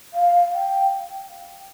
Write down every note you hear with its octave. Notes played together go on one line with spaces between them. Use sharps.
F5
G5